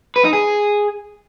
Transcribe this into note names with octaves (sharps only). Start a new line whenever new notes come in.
B4
D#4
G#4